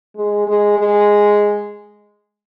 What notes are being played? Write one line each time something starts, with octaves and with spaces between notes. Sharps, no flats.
G#3
G#3
G#3